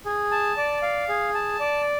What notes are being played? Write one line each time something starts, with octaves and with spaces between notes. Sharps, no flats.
G#4
A5
D5
F5
G#4
A5
D5